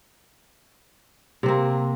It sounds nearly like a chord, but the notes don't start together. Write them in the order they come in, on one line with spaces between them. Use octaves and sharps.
C3 C4 A#3